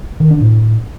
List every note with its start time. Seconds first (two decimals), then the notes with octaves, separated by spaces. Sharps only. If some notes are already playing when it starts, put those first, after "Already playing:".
0.20 D#3
0.30 D4
0.41 A2